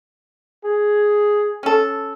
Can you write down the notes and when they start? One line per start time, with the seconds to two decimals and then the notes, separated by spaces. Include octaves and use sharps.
0.65 G#4
1.63 C#4 A4